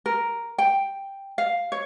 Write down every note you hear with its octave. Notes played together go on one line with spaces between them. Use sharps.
A#4
G5
F5
C#5